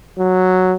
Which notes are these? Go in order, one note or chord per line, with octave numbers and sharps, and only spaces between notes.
F#3